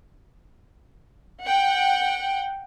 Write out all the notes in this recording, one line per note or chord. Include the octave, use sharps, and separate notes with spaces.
F#5 G5